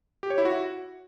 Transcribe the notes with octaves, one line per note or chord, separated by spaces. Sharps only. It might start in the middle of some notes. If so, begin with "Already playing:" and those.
G4
C#5
E4
F#4